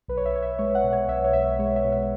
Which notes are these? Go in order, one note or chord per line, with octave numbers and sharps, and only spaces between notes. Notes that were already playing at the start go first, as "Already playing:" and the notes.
B1 B4
C#5
E5
B1 C#5
E5
G#3 C#5
F#5
B2
C#5
B1 E5
C#5
B1 E5
G#3 C#5
E5
B2
E5